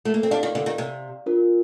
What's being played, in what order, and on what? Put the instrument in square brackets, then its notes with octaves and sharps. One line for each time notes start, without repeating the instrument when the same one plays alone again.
[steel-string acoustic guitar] A3
A#3
C4
[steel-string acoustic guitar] D4 [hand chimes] G4 D5 F5
[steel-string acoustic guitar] D#3
D3
D#3
C3
[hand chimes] D4 F4 A#4